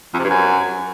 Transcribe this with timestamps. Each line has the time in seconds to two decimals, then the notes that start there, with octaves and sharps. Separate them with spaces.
0.14 F2
0.19 C3
0.24 G2
0.29 F#2